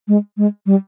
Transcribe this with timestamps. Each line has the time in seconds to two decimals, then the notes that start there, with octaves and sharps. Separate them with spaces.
0.08 G#3
0.37 G#3
0.66 G3